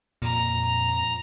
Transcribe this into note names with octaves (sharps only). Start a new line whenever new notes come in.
F2 A#2 A#5